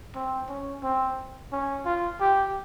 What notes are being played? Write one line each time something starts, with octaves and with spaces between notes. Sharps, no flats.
C4
C#4
C4
C#4
F4
G4